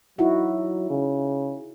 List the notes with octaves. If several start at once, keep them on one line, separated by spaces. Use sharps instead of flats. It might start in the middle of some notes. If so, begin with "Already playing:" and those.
F#3 D#4 E4 F#4
C#3